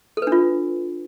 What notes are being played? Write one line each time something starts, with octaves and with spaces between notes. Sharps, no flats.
D4 F4 A4 B4